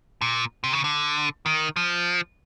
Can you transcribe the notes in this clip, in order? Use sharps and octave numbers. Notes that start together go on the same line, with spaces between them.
A#2
C3
C#3
D3
D#3
F3